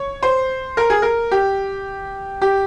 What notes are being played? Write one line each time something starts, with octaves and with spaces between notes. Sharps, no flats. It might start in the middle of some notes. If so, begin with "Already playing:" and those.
Already playing: C#5
C5
A#4
G#4
A#4
G4
G4